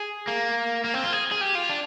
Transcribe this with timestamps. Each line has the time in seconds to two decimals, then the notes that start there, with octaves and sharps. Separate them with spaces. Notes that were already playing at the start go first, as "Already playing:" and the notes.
Already playing: G#4
0.28 A#3
0.84 A#3
0.94 C4
1.03 F4
1.13 G#4
1.32 G#4
1.41 G4
1.55 F4
1.70 D4